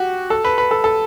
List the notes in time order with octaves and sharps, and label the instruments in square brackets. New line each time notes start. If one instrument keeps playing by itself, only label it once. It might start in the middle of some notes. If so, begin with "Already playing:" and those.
Already playing: [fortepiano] F#4 G4
A4
B4
B4
A4
A4